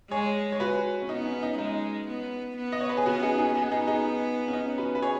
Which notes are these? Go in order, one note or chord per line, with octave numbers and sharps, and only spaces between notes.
G#3 G#4 C#5
C#5
F#4 B4
C#4
B3 D#4
C#4
D#4
G#3 D#4
B3
B3
D#5
C#5
B4
G#4
B3 C#4 F#4
D#4 G#4
D#4 G#4
B3 D#4 G#4
D#4 G#4
D#4 G#4
C#4
D#4
F#4 B4
B4
G#4 C#5